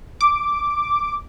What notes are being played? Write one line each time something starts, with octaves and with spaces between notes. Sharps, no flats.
D6